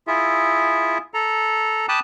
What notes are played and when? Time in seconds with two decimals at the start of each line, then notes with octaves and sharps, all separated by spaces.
0.07 E4 F4 G#4 E5
1.14 A4 A#5
1.89 G5 A5 B5 D6 D#6 F#6